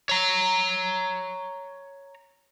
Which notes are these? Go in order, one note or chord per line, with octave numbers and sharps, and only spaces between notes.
C#5 A#5